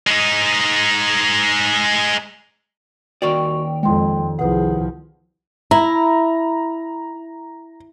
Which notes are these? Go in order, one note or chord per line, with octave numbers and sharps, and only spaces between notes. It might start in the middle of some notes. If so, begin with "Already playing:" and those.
G#3 D#4
D#2 F#4 A#4 D5 G5 C#6
F2 G#3 G5 C6
C2 F3 G#4 B4 F#5
E4 A#5